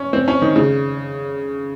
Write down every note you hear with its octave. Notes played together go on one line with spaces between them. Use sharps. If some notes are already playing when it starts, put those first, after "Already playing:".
Already playing: C#4
C4
C#4
D#3
C#3